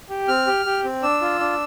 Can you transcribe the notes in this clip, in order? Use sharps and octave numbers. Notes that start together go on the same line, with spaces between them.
G4
C4 F6
G4
G4
C4
D4 E6
F4
D4